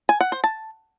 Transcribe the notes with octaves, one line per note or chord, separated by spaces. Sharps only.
G#5
F#5
C5
A5